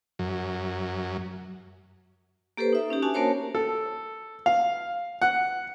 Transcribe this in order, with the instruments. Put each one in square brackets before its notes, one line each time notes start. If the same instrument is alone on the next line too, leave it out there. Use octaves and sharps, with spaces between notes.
[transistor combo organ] F#2
[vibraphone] A#3 G4 A4 B4 C5
D#4 E5
C#4 D#4 G4
C#4 D4 F#4 G#5 A5
A#3 F#4 A#4 C5 C#5 A5
[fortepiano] A4
F5
F#5